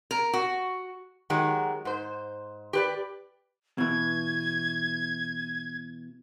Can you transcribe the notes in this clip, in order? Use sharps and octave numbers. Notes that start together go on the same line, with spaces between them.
A#4
F#4
D#3 F#3 G#3 G4
G#2 C5
G4 B4 D5
B2 E3 G#6